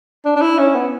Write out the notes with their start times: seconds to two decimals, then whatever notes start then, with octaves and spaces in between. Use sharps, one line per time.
0.25 D4
0.36 D4
0.42 E4
0.59 C#4
0.75 B3